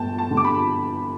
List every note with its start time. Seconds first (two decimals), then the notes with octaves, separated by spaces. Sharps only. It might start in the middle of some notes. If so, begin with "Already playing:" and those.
Already playing: G1 G5 A5
0.18 A5
0.31 D3
0.37 D6
0.45 B5